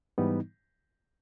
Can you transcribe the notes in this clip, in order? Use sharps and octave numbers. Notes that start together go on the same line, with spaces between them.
G#2 E3 G3 B3 D#4